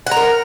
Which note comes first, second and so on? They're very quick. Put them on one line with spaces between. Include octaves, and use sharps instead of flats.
F#5 A#5 A#4